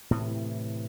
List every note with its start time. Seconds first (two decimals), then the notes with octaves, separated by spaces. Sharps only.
0.11 A2 C3 E3